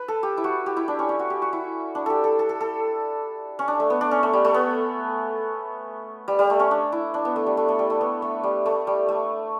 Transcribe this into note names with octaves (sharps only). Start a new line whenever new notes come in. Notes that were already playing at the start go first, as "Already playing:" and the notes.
Already playing: B4
A4
G4
E4
F#4
G4
E4
D4
C#4
C#4
F#4
G4
F#4
E4
D4
G4 A4
A4
A4
A4
A4
C#4
D4
A3
B3
D4
C#4
A3
G3
A3
B3
G3
G3
A3
C#4
D4
E4
D4
B3
A3
G3
A3
A3
G3
A3
B3
A3
G3
A3
G3
A3